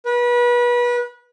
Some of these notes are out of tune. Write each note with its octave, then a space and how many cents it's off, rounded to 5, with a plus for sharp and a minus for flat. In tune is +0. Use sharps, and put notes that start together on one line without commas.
B4 -30